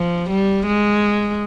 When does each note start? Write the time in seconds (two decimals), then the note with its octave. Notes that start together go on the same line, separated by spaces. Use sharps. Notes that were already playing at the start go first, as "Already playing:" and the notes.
Already playing: F3
0.30 G3
0.67 G#3